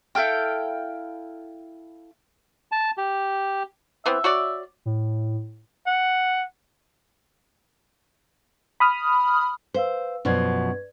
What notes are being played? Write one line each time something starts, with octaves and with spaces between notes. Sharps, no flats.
E4 A4 F5 G5
A5
G4
E3 B3 C4 E5
F#4 C#5 D5
A2
F#5
B5 D#6 F6
B4 C5 F5 E6
F#2 B2 F3 B4 D5 G#6